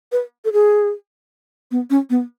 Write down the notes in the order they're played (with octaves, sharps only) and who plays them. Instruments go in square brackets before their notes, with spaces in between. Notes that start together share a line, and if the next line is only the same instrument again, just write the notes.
[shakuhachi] B4
A4
G#4
B3
C#4
B3